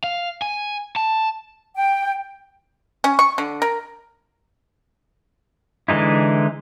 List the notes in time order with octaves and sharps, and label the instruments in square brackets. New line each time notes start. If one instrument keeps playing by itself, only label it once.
[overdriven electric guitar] F5
G#5
A5
[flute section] G5
[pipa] C#4
C#6
D3
A#4
[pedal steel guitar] D3 E3 G#3 D#4 E4